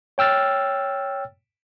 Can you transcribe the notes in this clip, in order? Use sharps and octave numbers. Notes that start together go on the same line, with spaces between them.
C#5 G5 E6 F6 A6